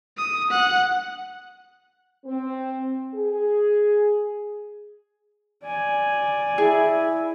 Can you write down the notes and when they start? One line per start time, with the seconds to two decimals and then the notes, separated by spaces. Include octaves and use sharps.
0.18 D#6
0.50 F#5
2.25 C4
3.14 G#4
5.64 D5 G#5
6.58 E4 G#4